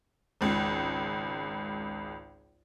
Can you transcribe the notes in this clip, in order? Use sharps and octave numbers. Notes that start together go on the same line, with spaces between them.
G#1 C#2